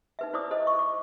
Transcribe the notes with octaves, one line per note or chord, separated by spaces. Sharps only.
D#4 B4 E5
E4 C5 D5 D6 D#6
A4 C5 D#5
C#6
D6